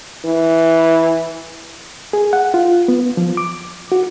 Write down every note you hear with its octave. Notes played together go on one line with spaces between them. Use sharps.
E3
G#4
F#5
F4
B3
F3
D6
F#4